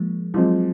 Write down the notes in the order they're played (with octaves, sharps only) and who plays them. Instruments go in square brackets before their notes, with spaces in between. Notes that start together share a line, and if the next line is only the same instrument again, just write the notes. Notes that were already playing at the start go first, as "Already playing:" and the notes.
Already playing: [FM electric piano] F3 G#3 A#3
[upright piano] F3 G#3 C4 [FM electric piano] F#3